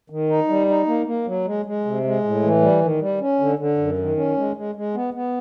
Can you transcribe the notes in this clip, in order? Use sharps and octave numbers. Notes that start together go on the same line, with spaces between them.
D#3
D#4
G3
D#4
A#3
A#3
F#3
G#3
G#3
C3
G#3
A2
E3
G3
D#3
G3
C#4
D3
D3
F#2
D#3
C#4
G#3
G#3
G#3
B3
B3